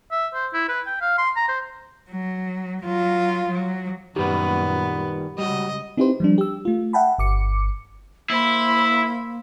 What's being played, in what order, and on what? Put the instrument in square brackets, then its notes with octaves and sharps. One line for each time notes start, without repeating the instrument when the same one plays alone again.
[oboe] E5
C5
E4
B4
G5
F5
C6
A#5
C5
[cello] F#3
F#3 F4
F#3
[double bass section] F#2 A#2 [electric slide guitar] D#3 G3 B4 [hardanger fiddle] B3 [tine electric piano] G4
[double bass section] C#3 G#3 [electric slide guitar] G3 F#4 [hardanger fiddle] D#5
[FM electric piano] C4 D#4 E4 G4 B4 C5
F3 G3 D4
G4 E6
A3 F4
E5 F#5 G5 A5 B5
G1 D6 C#7
[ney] A#3 [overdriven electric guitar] E4 [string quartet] C5 B5